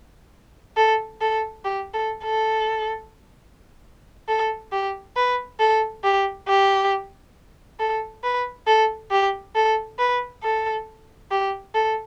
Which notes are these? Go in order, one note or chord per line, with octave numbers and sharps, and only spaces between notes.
A4
A4
G4
A4
A4
A4
G4
B4
A4
G4
G4
A4
B4
A4
G4
A4
B4
A4
G4
A4